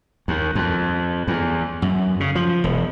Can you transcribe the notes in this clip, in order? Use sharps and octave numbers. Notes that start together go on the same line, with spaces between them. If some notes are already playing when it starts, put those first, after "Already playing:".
D#2
F2
E2
F#2
C#3
F3
E1